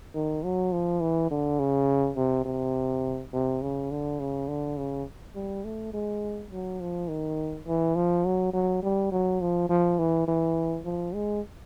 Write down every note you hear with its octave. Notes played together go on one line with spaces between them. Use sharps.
D#3
F#3
F3
E3
D3
C#3
C3
C3
C3
C#3
D3
C#3
D3
C#3
G3
A3
G#3
F#3
F3
D#3
E3
F3
F#3
F#3
G3
F#3
F3
F3
E3
E3
F3
G#3